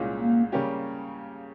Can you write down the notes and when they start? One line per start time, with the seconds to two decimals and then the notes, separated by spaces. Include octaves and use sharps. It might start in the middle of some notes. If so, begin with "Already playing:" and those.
Already playing: C2 A#2 G#3 C#4 F4
0.21 A#3
0.52 C#3 G3 A#3 C#4 G4